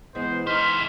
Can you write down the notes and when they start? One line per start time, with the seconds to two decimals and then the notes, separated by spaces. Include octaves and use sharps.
0.15 E3 G#3 B3 C5
0.47 E3 G#3 D#4 C5 F6 B6